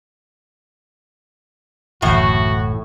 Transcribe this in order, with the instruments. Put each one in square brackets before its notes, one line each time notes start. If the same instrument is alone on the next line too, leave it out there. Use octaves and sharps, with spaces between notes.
[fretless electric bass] F#1 D2 E3 [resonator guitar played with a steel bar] A2 [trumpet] F#4